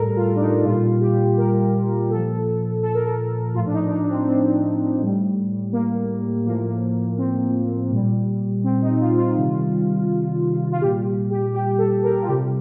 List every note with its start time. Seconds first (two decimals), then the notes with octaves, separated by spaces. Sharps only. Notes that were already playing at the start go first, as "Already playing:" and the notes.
Already playing: A2 G3 A4 A#4
0.16 F4
0.36 D4
0.41 D#4
0.65 A#2 G3 F4
1.01 G4
1.38 A#4
2.10 A#2 F3 A4
2.83 A4
2.94 A#4
3.05 A4
3.55 A2 F3 F4
3.66 D4
3.73 D#4
3.86 D4
3.91 D#4
4.04 D4
4.10 C4
4.27 C4
5.01 A2 G3
5.73 A#3
6.46 A2 F3 A#3
7.18 C4
7.91 A#2 G3
8.64 C4
8.82 D#4
9.00 F4
9.18 F4
9.36 C3 D#3 G3
10.72 F4
10.81 A#2 G3 G4
11.30 G4
11.54 G4
11.78 A4
12.03 A#4
12.22 F4
12.27 C3 G3 G4